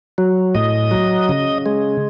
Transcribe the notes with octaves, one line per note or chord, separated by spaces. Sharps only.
F#3
A2 D#5
F#3
C#3
G#3